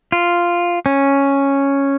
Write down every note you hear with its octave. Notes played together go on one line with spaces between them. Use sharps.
F4
C#4